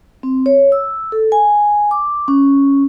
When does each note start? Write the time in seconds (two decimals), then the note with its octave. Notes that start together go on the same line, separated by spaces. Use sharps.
0.23 C4
0.46 C#5
0.72 E6
1.12 A4
1.32 G#5
1.91 D6
2.28 C#4